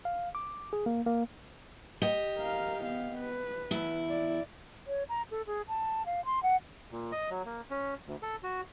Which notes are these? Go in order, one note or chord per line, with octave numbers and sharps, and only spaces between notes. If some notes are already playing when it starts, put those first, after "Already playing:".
F5
D6
G#4
A#3
A#3
G4 D#5
A#4 F5
B3 F5
B4
E2 E4
D5
C#5
A#5
A4
G#4
A5
F5
C6
F#5
A#2
D#5
F#3
A#3
C#4
D2
A4
F#4